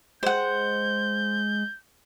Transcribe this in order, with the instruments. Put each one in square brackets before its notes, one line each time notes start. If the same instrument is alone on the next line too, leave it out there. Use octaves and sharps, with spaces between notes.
[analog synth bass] G#3 [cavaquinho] C5 F#5 [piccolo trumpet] G6